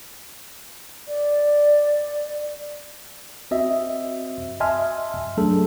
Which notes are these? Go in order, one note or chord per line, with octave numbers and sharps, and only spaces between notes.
D5
C4 F#4 D#5 E5
D#5 E5 G#5 A5 C6 F6
F#3 A3 D4 G#4 A4